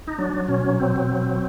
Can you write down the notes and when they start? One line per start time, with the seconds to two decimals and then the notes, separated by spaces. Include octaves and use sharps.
0.07 D#4
0.19 F#3 D4
0.33 F#3
0.48 B2 C#4
0.64 F#3
0.80 B2 C4
0.96 B2
1.11 F#3
1.26 F#3